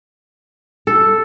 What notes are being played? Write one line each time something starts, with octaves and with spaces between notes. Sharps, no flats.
A4